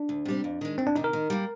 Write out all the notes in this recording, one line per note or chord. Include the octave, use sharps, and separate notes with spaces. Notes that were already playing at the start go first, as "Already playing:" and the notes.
Already playing: D4
D2
C3 G3 C4
F2
D#3 G#3
D2 C4
D4
C3 D#3 D#4
A#4
D#3
G3 A#3